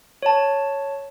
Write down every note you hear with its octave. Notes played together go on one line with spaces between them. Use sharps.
C#5 A5